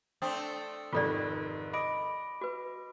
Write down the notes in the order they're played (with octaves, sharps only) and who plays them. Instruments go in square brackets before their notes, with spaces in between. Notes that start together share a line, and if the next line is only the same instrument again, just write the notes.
[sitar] A3 C4 D4 [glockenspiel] D#6
[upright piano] F1 G#2 D#3 [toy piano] F4 A4 D5
[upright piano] D#5 [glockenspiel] B5 D6 D7
[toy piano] F#4 B4